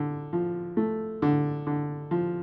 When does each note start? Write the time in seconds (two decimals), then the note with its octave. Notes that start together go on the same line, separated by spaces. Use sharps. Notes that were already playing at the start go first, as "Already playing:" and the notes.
Already playing: D3
0.33 F3
0.77 A3
1.22 D3
1.67 D3
2.11 F3